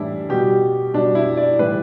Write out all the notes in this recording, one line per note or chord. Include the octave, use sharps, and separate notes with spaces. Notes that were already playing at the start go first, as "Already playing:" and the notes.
Already playing: A2 E3 G3 D4 E4
B2 G3 G4
B2 G3 D4
E4
D5
A2 E3 G3 B4